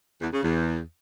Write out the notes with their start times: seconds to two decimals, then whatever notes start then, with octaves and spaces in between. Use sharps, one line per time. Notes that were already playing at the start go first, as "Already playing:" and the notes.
0.21 E2
0.32 C#3
0.42 E2